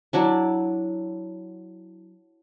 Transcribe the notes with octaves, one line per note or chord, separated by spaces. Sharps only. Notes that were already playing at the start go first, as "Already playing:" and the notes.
F#3 D4 E4